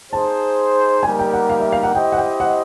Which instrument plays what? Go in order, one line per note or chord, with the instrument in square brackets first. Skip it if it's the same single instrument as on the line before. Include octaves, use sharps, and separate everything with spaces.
[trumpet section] D#4 G#4 C5 [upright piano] A5
[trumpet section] G3 A#3 D#4 G4 A#4 [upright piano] G#5
[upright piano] G5
F#5
F5
E5
F5
F#5
[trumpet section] E4 G4 C5 D#5 [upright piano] G5
[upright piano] F#5
G5
F#5